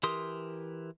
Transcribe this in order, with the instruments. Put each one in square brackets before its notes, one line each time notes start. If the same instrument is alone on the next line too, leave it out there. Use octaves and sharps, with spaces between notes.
[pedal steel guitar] E3 G4 A#4 C6 D#6